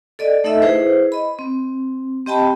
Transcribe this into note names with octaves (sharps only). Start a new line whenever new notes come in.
A4 D5 D#5
A3 D#4 A4 D#5 E5 E6
E4 G#4 B4 C5
D#5 B5
C4
C4 G4 D#5 G5 A5 B5